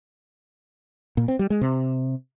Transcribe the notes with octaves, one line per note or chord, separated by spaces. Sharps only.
A#2
C4
G3
G#3
C3